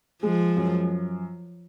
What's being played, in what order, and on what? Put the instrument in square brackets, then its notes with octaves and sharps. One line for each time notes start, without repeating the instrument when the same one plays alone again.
[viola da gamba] F3 [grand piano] G#3
[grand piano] F#2